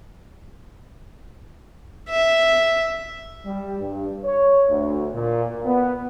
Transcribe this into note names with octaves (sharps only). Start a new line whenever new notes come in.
E5
G3
G2
C#5
D2
A#2
B3